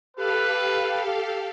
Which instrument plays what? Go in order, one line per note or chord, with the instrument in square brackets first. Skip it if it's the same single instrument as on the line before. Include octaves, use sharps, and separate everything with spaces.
[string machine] G4 A4 F5 [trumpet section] B4